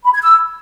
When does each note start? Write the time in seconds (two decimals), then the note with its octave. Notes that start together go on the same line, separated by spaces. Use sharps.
0.04 B5
0.13 G#6
0.22 E6